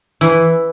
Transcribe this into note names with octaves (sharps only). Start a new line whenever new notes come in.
E3